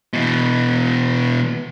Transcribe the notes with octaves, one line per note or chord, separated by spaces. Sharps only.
B2 E3